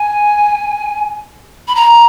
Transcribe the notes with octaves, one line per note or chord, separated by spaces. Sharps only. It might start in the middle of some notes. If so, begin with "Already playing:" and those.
Already playing: G#5
B5
A#5